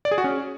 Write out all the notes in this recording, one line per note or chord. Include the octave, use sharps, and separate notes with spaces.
D5
G#4
F#4
C#4